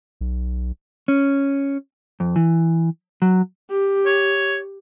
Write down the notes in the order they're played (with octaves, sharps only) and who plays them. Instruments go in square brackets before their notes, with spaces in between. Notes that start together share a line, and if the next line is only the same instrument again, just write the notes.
[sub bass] B1
[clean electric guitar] C#4
F2
E3
F#3
[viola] G4
[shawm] C#5